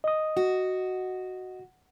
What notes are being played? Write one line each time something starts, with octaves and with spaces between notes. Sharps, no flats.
D#5 D#6
F#4